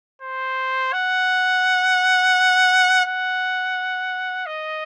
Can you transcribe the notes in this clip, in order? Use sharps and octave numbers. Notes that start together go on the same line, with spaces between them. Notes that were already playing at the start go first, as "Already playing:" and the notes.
C5
F#5
F#5
D#5